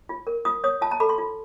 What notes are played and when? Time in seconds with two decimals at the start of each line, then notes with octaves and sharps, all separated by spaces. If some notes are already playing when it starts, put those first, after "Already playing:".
0.09 F4
0.27 A#4
0.45 F4 D#6
0.64 C#5 D#6
0.81 F4 A5
0.91 A#5
1.00 A4 B5
1.09 C6
1.18 F4